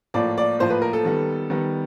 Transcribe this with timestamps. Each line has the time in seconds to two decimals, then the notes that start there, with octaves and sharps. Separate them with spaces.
0.14 A2 F3 A#3 D5
0.38 D5
0.59 A2 F3 A#3 C5
0.70 B4
0.82 A#4
0.93 A4
1.05 D#3 G3 B3
1.50 D#3 G3 B3